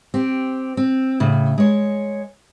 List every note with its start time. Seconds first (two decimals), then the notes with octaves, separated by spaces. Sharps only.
0.14 C4 G4
0.77 C4
1.20 A2 C#3
1.58 G#3 C#5